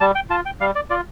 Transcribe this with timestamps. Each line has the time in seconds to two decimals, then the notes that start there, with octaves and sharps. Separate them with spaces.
0.01 G3 A5
0.15 G5
0.30 F4 A5
0.46 G5
0.60 G3 F5
0.76 D5
0.90 F4 D5